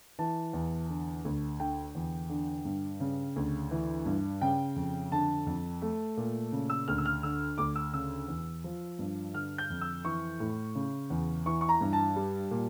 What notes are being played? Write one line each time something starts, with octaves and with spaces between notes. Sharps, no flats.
E3 A5
E2
D3
D2
D3 G5
E2
D3
G2
C#3
D2
E3
G2
C#3 G5
F2
D3 A5
F2
A3
A#2
C#3
E6
D2 F6
E6
F6
D3 E6
D2 D6
E6
C#3 E6
E2
F3
G2
D3 F6
G6
F2
E6
E3 C#6
A2
C#3
E2
E3 C#6
C#6
A#5
G2
A5
G3
A#2